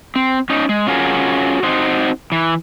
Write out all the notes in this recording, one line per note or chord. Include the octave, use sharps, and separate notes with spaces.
C4
C#4 D#4
G#3
C#4 F4 F#4 G#4 A#4
C4 D#4 F#4 C5
E3